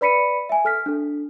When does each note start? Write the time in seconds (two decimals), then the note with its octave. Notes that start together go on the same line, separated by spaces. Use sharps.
0.01 B4 D5 B5 B6 C#7 D#7
0.49 E5 G#5
0.65 A4 F6 B6
0.86 D4 A4